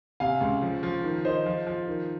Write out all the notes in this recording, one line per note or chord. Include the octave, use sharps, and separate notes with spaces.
C3 F5 G#5
C#2
F3
F3
D#3
D#3 C5 D#5
F3
F3
D#3